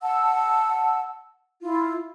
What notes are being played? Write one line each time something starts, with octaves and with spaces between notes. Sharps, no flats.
F#5 A5 E6
E4 F4